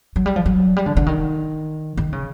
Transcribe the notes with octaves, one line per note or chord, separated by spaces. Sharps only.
F#3
G3
F3
F#3
G3
D3
D3
D#3
D#3
C#3